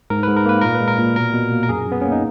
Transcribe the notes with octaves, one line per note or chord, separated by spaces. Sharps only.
G#2 A#4
G#2 B4
A#4
A#3 B4
A#2 A#4
B4
G#3
A#4
A#2
B2 A#4
B2
A#3
A#4
F#2 G#4
F#2
B3
A#3 C#4
D#4